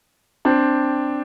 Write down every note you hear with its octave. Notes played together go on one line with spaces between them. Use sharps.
C4 D4